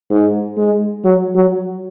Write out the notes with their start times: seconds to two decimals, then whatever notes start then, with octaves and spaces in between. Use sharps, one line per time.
0.10 G#2
0.57 G#3
1.05 F#3
1.35 F#3